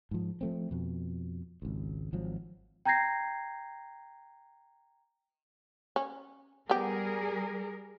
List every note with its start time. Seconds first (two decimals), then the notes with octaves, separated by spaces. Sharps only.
0.11 G#2 F3
0.41 F3 A3 C4
0.71 F2 B2
1.62 G#1 C#2
2.13 G#1 F3 F#3
2.85 G5 A#5 G6 G#6 A#6 C7
5.96 C#4
6.69 G3 B3 G4 G#4 A#4